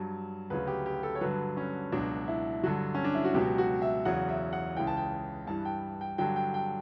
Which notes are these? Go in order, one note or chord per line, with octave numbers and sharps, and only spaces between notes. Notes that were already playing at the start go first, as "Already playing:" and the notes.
Already playing: G2 F#3
D2 C#3 F#3 B4
G4
G4
A4
C#5
G2 D3 F#3 B4
C#4
C#2 B2 F#3 D4
E4
G2 D3 F#3 F#4
C#4
D4
E4
F#4
C#2 B2 F#3 G4
F#4
E5
E2 C#3 F#3 F#5
E5
F#5
C#2 C#3 E3 G5
A5
G5
G2 E3 A5
G5
G5
G2 D3 F#3 G5
G5
G5